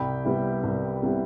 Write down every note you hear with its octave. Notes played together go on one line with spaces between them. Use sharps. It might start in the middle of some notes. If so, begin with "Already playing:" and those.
Already playing: C2 G5 B5
C3 G3 B3 E4
C2
C3 G3 B3 E4